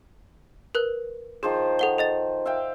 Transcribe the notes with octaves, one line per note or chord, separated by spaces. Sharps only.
A#4 B4 F#6
D#3 F3 G#4 C5
A4 F#5 G7
A4 D#5 A6
E5 F5 G5